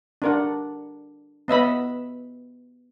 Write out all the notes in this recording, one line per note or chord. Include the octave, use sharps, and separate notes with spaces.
D4 A#4 F#5
B3 D#5 E5 B5